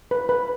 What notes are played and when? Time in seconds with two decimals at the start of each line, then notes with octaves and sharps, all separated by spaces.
0.11 B4
0.29 B4